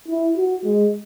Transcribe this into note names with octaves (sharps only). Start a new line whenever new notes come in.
E4
F#4
G#3